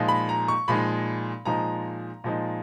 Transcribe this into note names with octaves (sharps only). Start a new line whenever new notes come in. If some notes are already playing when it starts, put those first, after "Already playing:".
Already playing: A#2 F3 G#3 D#4
B5
A#5
C#6
A#2 F3 G#3 D#4 B5
A#2 F3 G#3 D#4 A#5
A#2 F3 G#3 D#4